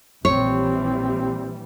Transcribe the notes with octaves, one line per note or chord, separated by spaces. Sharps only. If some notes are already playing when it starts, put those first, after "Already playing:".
A#1 E3 G3 C4 C#5